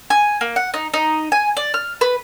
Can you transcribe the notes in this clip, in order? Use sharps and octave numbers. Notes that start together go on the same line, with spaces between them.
G#5
A#3
F#5
D#4
D#4
G#5
D5
F6
B4